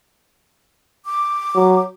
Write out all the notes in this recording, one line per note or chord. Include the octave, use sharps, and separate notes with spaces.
D6
F#3